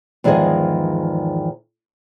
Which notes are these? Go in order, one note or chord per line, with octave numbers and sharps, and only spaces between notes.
E2 G#2 D#3 F3 G#4 D#5